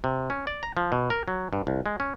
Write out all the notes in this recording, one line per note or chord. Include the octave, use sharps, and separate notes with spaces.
C3
C#4
D5
A#5
F3
B2
A#4
F#3
G2
C2
G#3
C#4